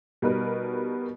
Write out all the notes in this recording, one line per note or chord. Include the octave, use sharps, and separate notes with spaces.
B2 G3 D#4 A#4 B4